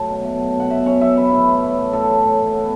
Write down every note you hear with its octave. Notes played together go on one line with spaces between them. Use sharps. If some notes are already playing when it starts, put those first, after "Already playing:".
Already playing: A2 F#3 A5
B2
A3
F#3
B2 F#5
B2 E5
C#4 C#5
F#3 E5
C#4 B4
A2 E4
E3
A3
A2
A2 A4
A2
A2
A2
B3